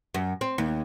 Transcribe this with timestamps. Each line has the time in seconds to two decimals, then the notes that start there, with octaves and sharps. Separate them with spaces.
0.14 F#2
0.41 C4
0.58 D#2